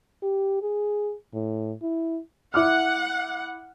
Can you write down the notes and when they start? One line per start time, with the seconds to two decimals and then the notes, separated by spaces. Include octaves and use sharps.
0.23 G4
0.62 G#4
1.34 A2
1.82 E4
2.54 E4 F#5 D6 F6